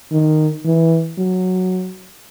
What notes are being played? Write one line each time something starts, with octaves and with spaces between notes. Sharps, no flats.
D#3
E3
F#3